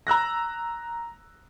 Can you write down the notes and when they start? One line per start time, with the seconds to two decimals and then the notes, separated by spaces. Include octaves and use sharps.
0.07 A#5 E6 F#6 A#6